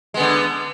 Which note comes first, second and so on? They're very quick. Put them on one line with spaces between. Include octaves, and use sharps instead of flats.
G#3 B3 D3